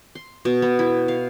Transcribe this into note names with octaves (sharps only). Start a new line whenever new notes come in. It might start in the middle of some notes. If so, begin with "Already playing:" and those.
C6
B2
B3
E4
F5